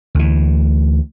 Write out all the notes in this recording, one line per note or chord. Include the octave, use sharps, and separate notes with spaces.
D2 E3